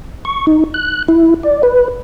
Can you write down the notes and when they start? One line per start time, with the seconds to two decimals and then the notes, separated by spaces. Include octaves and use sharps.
0.25 C#6
0.47 D#4
0.74 F#6
1.08 E4
1.43 D5
1.63 B4